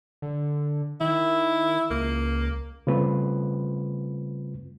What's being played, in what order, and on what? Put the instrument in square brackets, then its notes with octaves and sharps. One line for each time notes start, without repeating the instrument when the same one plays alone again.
[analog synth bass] D3
[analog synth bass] D#3 [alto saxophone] E4
[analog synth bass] C#2 [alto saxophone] A#3
[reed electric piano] C#3 G3 A3 C4 F4 B4